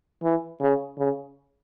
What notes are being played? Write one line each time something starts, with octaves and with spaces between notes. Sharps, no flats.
E3
C#3
C#3